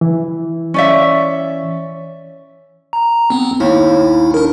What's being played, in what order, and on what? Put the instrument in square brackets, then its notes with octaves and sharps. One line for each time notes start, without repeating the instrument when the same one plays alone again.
[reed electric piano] E3
[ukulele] C#4 D5 E5
[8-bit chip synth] A#5
B3 C4
[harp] D#2 [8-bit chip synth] E4
[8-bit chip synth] D4 A#4